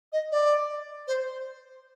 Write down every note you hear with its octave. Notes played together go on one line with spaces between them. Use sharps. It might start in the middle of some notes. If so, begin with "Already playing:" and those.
D#5
D5
C5